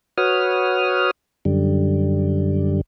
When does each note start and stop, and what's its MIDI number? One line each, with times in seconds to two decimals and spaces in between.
0.18 1.11 66
0.18 1.11 71
0.18 1.11 73
0.18 1.11 87
0.18 1.11 89
1.45 2.81 42
1.45 2.81 50
1.45 2.81 55